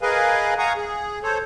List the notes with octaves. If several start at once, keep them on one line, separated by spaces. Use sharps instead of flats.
G#4 A#4 B4 D#5 F5 G#5
F5 F#5 G#5 A#5 C#6 D#6
G#4
A4 C5 C#5